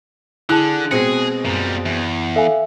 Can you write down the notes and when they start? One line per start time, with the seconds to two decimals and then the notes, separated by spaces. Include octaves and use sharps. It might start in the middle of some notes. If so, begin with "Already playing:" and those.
0.49 D3 E4 G#4 A5 F#6
0.91 B2 G#3 C4 G#4 C#7
1.45 F#2 A#2 G3
1.86 E2
2.36 A4 E5 F5 G#5